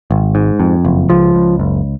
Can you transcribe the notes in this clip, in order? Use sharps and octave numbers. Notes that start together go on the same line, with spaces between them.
G#1
G#2
F2
F#1
C#2 F3
C#2
F#1